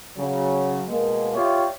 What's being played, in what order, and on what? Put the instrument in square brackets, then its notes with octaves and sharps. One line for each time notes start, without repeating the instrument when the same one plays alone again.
[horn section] C#3 F#3
B2 G#3 A#3
F4 G4 C#5 D5 E5